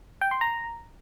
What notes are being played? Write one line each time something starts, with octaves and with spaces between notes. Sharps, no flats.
G5
C6
A#5